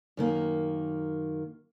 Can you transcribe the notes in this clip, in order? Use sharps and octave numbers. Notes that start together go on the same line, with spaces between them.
F#2 D#3 A#3